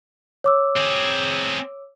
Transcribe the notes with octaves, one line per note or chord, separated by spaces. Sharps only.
C#5 D6 E6
C4 G#4